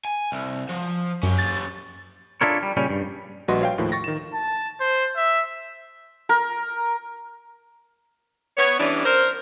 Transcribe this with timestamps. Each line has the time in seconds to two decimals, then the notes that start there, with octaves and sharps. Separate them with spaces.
0.05 G#5
0.32 C2
0.69 F3
1.23 F#2 C#4 G4
1.39 A6
2.41 D4 E4 F4 A4 A#4 C#5
2.62 G3
2.77 A#2 C#3 G3 C#4
2.90 G2
3.48 A#1 G3 F#4 B4 D#5 C6
3.61 C#5 F5 G5
3.78 D#2 A2 D#3 F3
3.92 C#6 A6 A#6
4.04 D#3 E7
4.34 A5
4.81 C5
5.17 E5
6.29 A#4
8.57 B3 C#5
8.79 E3 G3 B3 C#4 D4
9.05 A#4 C5